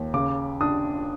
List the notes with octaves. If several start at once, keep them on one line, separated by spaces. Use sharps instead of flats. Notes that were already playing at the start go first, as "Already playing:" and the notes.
Already playing: D#2
C#3 D6
D4 D#6